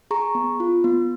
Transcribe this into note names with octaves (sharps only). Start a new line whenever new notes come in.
G#4 A#5 C#6
B3
F4
B3